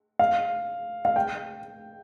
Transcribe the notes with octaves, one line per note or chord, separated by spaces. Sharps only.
F5
F5
G5